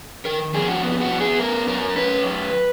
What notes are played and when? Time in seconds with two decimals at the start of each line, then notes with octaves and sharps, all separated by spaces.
0.25 D#3 A#4
0.54 F2 G#4
0.68 F#4
0.83 B3
1.01 F#4
1.11 B3
1.20 G#4
1.39 F#2 A#4
1.67 F#2 A#4
1.96 C#4 B4
2.23 F#2